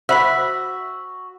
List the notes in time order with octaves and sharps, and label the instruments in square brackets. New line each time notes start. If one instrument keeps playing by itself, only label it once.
[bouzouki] F#4 [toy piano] C5 [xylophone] E5 B5 B6 [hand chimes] E6